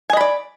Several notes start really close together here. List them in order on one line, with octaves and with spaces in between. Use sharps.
G#5 D#5 B5 D5